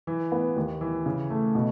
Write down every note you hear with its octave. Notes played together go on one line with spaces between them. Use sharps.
E3
B3
D#2
E3
C#3
A3
B2